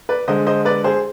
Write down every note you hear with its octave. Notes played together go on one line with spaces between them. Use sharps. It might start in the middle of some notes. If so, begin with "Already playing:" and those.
B4 D5
D3 G#3 C5 D#5
C5 D#5
B4 D5
G#4 C5